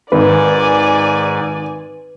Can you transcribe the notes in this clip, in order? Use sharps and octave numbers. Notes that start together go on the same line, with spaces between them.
G#1 G#2 B4 D5 G#5